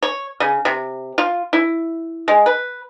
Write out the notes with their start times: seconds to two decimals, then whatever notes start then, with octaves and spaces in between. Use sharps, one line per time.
0.02 C#5
0.40 C#3
0.65 C3
1.18 F4
1.53 E4
2.28 G#3
2.46 B4